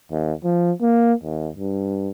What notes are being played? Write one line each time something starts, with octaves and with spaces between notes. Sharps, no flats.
D#2
F3
A#3
D#2
G2